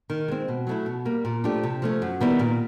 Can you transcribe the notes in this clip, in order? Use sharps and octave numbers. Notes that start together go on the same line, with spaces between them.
D#3
G#3 C4
B2
F#3 A3 C#4 E4
B2
G3 A#3
A#2
F3 A3 D4 G4
C3
F3 A3 C#4
F#2
D#3 G3 B3 E4
A#2